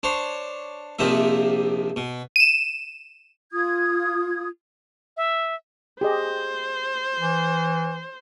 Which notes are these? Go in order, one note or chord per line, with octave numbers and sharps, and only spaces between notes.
D4 C5 C#5
A#1 F2 C3 F3 D#4 E5
B2
D#7 E7
F4 D#6 G#6
E5
G4 G#4 C5 D#5
E3